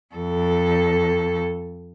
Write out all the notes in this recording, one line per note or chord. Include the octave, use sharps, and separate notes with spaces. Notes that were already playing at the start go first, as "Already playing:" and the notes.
F2 A4